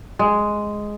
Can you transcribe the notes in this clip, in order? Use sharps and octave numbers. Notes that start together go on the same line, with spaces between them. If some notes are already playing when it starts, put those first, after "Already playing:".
G#3